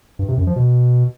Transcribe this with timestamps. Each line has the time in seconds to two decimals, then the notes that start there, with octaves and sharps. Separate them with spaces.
0.19 G2
0.28 C3
0.38 F#2
0.47 F3
0.56 B2